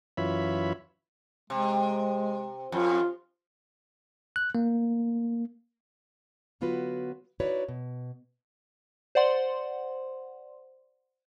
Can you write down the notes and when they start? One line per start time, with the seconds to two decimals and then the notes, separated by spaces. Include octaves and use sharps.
0.17 F#2 E3 F4 C#5 E5 B5
1.50 C3 G#3
2.72 F2 F4
4.36 F#6
4.55 A#3
6.61 D3 F#3 B3 F4 F#4 B4
7.40 D#4 E4 F#4 B4 C#5 D5
7.68 B2
9.15 C5 D5 F#5 C6